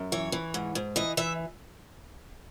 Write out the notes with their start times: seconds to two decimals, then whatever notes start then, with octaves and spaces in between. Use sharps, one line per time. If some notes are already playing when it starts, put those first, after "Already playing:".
Already playing: F#2
0.12 E3 C#5
0.32 E3
0.54 G#2
0.75 G#2
0.96 E3 D#5
1.17 E3 E5